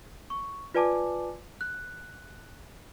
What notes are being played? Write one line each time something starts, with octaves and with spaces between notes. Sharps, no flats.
C#6
F4 B4 D5 G#5 A5 D6
F#6